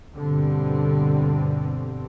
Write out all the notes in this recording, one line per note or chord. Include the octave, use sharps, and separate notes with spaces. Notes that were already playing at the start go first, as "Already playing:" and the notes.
G1 G2 B2 D3 G3 C4